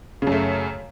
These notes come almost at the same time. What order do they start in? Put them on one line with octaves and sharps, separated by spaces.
C#3 F#2 A3